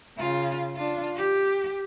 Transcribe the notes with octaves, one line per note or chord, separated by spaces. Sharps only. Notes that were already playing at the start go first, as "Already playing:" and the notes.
C#3 F4
D4 F4
G4